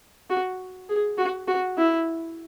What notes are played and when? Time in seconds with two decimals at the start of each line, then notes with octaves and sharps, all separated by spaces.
0.30 F#4
0.89 G#4
1.18 F#4
1.48 F#4
1.78 E4